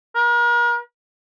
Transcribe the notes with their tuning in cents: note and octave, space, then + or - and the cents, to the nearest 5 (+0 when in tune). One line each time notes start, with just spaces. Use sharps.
A#4 +40